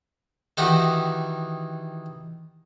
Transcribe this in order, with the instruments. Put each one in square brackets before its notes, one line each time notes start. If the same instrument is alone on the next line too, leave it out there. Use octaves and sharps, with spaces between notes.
[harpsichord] D#3 E3 D#4 F#4 G4